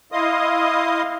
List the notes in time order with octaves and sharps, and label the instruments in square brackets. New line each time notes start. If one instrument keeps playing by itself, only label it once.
[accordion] E4 D#5 F5 C6 D#6